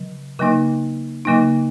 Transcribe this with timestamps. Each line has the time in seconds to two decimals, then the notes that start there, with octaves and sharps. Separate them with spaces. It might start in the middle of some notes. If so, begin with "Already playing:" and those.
Already playing: C#3 F#3
0.39 C#3 F#3 A#3 D#4
1.25 C#3 F#3 A#3 D#4